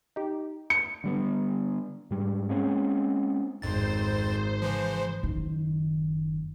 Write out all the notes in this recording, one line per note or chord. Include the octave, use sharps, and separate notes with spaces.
D#4 G4
C#7
D3 G3 B3
G#2 G3
G#3 A#3 C4 C#4
G#1 F2 C5 A6
C#3 E3 F3
F#1 D#3